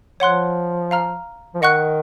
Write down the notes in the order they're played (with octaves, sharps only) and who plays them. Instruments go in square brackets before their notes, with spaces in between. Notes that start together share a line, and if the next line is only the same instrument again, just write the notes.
[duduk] F3 [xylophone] C#5 F#5 C6 F#6
[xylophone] F5 A#5 F6
[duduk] F3
[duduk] D#3 [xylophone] D#5 F#5 C#6 F#6